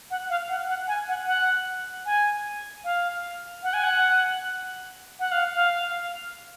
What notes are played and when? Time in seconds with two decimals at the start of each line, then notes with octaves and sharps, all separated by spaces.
0.11 F#5
0.30 F5
0.49 F#5
0.68 F#5
0.88 G#5
1.08 F#5
1.27 F#5
2.06 G#5
2.84 F5
3.63 F#5
3.74 G#5
3.84 F#5
5.20 F#5
5.32 F5
5.55 F5